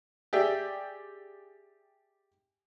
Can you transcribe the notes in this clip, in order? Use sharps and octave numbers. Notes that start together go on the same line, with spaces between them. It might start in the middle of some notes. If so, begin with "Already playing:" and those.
G4 G#4 D5 E5 G5